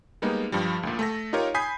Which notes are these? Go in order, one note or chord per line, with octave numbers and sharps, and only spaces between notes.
G3 G#3 A#3 B3 D#4
G2 F3 G3
D2 A#2
A3 A4 A#6
D#4 F4 G4 A#4 C#5
G#5 B5 D#6 G6 B6 C7